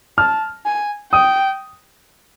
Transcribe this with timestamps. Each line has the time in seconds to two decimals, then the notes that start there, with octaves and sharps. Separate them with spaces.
0.18 A5 F6
0.65 G#5
1.12 G5 D#6